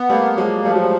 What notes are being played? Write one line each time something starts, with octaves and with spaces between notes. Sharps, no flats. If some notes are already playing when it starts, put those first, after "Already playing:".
Already playing: B3
G3 A3 A#3
F3 F#3 G#3
F3 G3 A3
F#3
G3